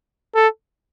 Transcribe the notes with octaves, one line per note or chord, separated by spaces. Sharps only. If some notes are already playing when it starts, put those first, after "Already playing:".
A4